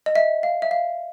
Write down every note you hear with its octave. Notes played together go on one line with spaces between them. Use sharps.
D#5
E5
F5
E5
F5